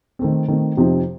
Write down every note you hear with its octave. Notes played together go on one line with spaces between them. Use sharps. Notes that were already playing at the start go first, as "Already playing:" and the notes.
D#3 A3 C4
D#3 A3 C4
F2 C3 F3 C4 D#4